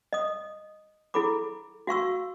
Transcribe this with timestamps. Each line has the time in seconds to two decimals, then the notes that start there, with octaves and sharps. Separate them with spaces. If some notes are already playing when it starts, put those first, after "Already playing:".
0.13 D#5 D#6
1.14 E4 G#4 A4 B5 D6
1.87 F#4 F5 C#6 E6